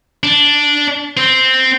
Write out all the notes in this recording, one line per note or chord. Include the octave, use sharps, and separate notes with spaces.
D4
C4